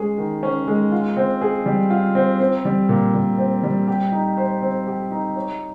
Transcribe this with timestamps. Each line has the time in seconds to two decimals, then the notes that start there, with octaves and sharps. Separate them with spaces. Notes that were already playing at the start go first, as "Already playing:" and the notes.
Already playing: G#3 C#4 G#4
0.18 D#3
0.43 C#4
0.67 G#3
0.92 F4
1.17 C4
1.41 G#4
1.66 G3
1.90 F4
2.15 C4
2.40 C4
2.65 G3
2.89 A#2
3.14 A#2
3.38 C4
3.63 G3
3.88 G4
4.12 D#4
4.37 C5
4.62 C4
4.87 G4
5.11 D#4
5.36 C#5